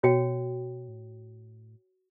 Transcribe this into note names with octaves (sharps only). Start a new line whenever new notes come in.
B2 F#4 C#5 G5
A2